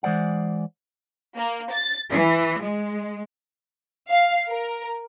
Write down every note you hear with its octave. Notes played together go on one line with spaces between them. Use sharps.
E3 G#3 C5 D5 F#5
A#3
A6
E3
G#3
F5
A#4